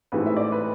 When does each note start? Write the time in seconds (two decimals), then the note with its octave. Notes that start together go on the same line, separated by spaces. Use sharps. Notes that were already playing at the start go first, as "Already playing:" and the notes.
0.12 A1 G#2 E3 A3 C4 B4
0.26 E5
0.37 D5
0.52 B4